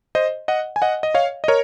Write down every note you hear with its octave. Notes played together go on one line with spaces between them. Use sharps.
C5 D#5
D#5 F#5
G#5
D#5 F#5
D#5
C#5 F5
D#5
A#4 C#5